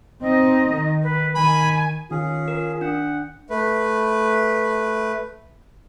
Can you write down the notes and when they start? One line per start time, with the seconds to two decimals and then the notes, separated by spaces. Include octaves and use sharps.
0.22 C4 D#4 D#5
0.70 D#3
1.03 B4
1.35 D#3 G#5 B5
2.11 D#3 C#4 F4 G#4
2.48 A#4
2.81 D4 F#5
3.50 A3 B4